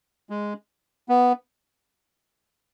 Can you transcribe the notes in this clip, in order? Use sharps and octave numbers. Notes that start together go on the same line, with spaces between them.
G#3
B3